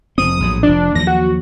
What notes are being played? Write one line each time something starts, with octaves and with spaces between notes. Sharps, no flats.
F1 F2 C4 D#6
A#1 A2 F#3
F1 F3 D4
D#2 F3 F#3 A#6
F#4